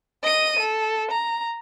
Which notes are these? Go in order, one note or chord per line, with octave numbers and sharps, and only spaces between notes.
D#5 D#7
A4
A#5